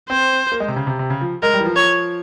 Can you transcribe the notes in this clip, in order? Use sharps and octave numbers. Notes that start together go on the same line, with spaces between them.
C4 C5
A#3
G#3
C3
C#3
C3
C3
C#3
F3
G#3 A#4
G3
E3
F3
C#5